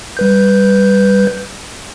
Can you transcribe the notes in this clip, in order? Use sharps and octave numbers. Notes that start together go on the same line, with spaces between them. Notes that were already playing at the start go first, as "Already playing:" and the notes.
G3 B4 G6